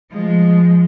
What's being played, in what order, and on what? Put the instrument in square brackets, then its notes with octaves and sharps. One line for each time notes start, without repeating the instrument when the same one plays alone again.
[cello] F3 G#3